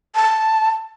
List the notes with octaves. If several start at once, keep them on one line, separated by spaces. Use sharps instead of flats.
A5